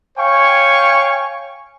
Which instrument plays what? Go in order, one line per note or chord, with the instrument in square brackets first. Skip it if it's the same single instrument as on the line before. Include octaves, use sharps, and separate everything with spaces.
[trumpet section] C#5 F5 G5 G#5 C#6